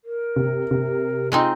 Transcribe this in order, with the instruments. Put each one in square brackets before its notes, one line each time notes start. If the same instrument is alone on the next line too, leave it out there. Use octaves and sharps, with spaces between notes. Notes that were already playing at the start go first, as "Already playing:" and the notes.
[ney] A#4
[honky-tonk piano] C3
C3
[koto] G#3 C4 D#4 [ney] F4